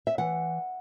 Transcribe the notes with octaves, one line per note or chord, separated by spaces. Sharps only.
E5
E3 F#5